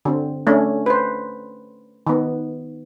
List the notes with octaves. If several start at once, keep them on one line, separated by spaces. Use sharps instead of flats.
D3 C4
A3 C#4 D4
B4 C5
D#3 B3